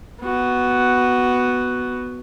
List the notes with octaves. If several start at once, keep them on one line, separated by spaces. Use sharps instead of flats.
B3 F#4